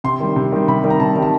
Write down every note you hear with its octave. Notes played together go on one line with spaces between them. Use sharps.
C3 C6
D#3 G3
C3
D#3 G3
C3 B5
D#3 G3
A#5
C3 A5
D#3 G3
A5